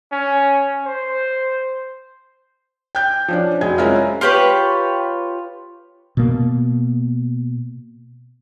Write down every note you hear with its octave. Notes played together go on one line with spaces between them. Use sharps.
C#4
C5
G5 G6
F3 C#4 D4
F1 F#3 G#4 D#5 G#6
G#3 C4 C#4 E4 F4 A#4
F4 G4 B4 C#5
B2 A#3